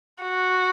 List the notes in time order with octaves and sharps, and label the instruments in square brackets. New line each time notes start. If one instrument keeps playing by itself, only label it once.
[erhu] F#4